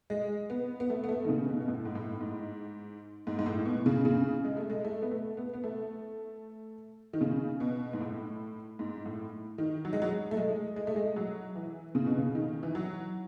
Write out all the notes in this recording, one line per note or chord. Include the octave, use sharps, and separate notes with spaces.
G#3
B3
B3
A3
B3
A3
D#3
C#3
B2
B2
A2
G#2
A2
G#2
G#2
G#2
A2
B2
C#3
C#3
G#3
A3
G#3
A3
B3
A3
B3
B3
A3
D#3
C#3
B2
G#2
A2
G#2
A2
D#3
F#3
G#3
F#3
A3
G#3
G#3
A3
G#3
F#3
E3
C#3
B2
C#3
D#3
E3
F#3